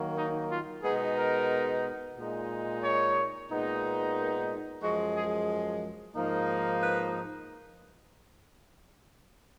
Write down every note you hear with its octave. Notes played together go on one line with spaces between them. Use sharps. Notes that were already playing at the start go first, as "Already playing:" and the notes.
Already playing: D#3 F#3 A#3
D#4
F4
B2 G#3 B3 D#4 G#4
A#4
A#2 G#3 D#4
C#5
A#2 G#3 B3 D#4
A#4
F#2 F3 G#3 F#4
G#4
G#2 F3 A#3 D#4
B4